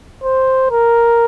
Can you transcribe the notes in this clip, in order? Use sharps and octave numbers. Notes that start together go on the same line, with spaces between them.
C5
A#4